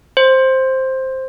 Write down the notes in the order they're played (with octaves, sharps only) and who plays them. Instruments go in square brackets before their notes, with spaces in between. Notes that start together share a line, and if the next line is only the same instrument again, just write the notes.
[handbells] C5